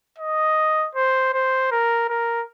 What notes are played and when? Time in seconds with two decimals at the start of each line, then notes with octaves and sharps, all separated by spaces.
0.18 D#5
0.95 C5
1.33 C5
1.71 A#4
2.09 A#4